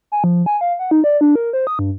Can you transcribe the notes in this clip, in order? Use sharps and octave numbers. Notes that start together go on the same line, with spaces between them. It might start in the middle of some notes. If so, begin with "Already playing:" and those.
G#5
F3
G#5
F5
F#5
D#4
D5
D4
A#4
C5
D#6
G2